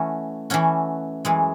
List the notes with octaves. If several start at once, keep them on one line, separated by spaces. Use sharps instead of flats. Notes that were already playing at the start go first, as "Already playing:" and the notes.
Already playing: E3 A3 C#4 F#4
E3 A3 C#4 F#4
F#2 E3 G#3